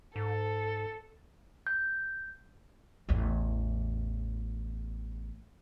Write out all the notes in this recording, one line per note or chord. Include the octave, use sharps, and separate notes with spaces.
G#2 A4
G6
A1 E2